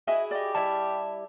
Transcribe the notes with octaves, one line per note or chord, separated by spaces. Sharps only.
E4 F#4 G#4 D#5 E5 G#5
G4 D5 D#5
G3 E4 E5 A5